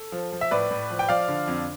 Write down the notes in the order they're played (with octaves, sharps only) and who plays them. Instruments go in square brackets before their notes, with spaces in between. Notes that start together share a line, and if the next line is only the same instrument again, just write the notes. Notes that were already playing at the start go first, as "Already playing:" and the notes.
Already playing: [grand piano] A4
F3
F3
E5
A2 B4 D5
A2
F3
G5
F3 D5 F5
D3
F2